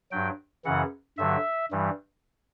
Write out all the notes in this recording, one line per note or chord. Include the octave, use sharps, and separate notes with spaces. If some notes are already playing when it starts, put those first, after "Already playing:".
G2 F#3 G5
F#2 C#3 E3 F#5
G2 D3 F#3 E5
G2 E3 G3